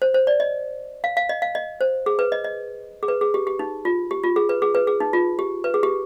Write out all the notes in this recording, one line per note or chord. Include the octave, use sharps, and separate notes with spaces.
C5
C5
D5
D#5
F5
F5
D#5
F5
D#5
C5
G#4
B4
D#5
D#5
G#4
B4
G#4
G4
G4
D#4
F4
G4
F4
G#4
B4
G#4
B4
G#4
D#4
F4
G4
B4
G#4
G4